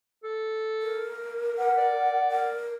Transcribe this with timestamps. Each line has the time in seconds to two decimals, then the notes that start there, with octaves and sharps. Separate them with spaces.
0.24 A4
0.82 A#4
1.58 B4 F#5
1.77 D5
2.31 A#4